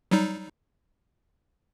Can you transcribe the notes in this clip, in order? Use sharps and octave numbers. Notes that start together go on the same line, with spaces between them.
F#3 G3 D#4